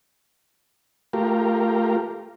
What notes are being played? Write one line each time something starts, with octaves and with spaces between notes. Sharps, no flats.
A3 F4 G4 A#4